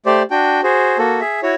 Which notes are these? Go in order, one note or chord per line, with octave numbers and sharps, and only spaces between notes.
A3 G4 C5 D5
D4 F#4 G5
F#4 G#4 C5
A#3 F#4 A4
G#4 E5
E4 F#4 C#5